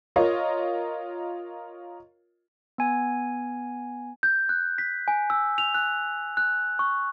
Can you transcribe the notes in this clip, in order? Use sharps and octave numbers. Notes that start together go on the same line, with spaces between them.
F4 A#4 C#5 D#5
B3 G#5
G6
F#6
B6
G#5
E6
F7
F#6
F#6
C#6